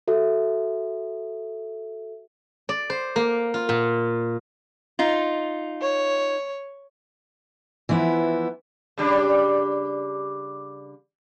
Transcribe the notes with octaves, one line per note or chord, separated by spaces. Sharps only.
F#4 A4 E5
D5
C5
A#3
F4
A#2
D#4 F4
C#5
E3 F3 B3 E4
C#3 G3 D4